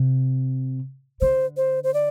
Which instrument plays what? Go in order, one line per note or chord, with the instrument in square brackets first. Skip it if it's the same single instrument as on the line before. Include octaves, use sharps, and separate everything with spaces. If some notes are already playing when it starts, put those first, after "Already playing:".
Already playing: [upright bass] C3
[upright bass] D3 [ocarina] C5
[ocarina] C5
C5
D5